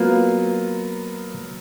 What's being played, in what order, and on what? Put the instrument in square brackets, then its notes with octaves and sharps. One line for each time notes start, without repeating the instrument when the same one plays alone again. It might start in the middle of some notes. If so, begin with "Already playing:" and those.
Already playing: [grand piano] F#3 B3 F4 [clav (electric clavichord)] A#3